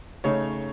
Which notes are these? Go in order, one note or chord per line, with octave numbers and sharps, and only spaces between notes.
C#3 A3 D#4 C#5